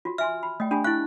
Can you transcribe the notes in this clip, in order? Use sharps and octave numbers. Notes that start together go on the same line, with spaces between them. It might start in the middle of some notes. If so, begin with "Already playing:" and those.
F4 F#4
E5 G#5 C6 F6
B5
A3 D#5 G5
D4 G4 G#5 B5
E4 F5 C#6 F#6